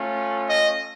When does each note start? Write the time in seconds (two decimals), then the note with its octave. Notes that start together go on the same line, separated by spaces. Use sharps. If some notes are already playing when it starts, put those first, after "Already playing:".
Already playing: A3 C#4 F4
0.48 D#5